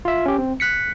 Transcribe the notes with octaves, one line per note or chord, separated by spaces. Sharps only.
F4 E5
C#4 G4
C4
F#6 B6 C#7